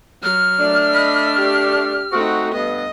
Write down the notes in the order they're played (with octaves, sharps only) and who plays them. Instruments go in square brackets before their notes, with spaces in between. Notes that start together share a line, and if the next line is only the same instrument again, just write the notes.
[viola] F#3 [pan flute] F6
[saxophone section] A3 D4
[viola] D#5 B5
G4
[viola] A3 D#4 [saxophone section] C4 F#4
[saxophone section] G2 B3 [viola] D#5